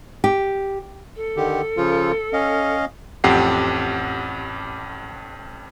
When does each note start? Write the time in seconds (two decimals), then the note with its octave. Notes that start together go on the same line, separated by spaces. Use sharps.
0.24 G4
1.16 A4
1.36 D3 D#3 G4
1.77 C#3 F3 F4
2.33 C#4 D#5 F5
3.24 A1 F2 G4 F#5 C7